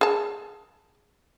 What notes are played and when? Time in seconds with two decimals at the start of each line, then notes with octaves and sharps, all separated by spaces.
0.01 G#4 A5